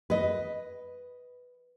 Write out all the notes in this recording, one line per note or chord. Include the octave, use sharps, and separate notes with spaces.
B4 D#5